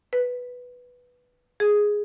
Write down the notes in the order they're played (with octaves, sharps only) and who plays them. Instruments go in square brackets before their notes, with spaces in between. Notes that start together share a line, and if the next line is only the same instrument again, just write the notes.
[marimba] B4
G#4